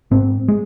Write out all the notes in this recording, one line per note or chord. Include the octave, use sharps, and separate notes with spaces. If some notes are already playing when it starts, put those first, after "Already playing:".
G#2 C4
G#3